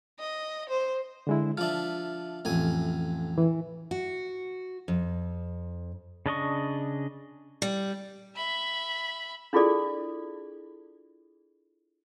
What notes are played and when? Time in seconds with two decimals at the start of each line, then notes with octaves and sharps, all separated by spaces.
0.20 D#5
0.69 C5
1.27 D3 G#3 E4
1.57 F3 D4 E5 F6
2.45 A1 F2 G#5
3.38 E3
3.91 F#4
4.88 F2
6.26 C#3 D4 D#5 C#6
7.62 G3
8.36 E5 B5
9.53 D4 E4 F4 G#4 A4 D5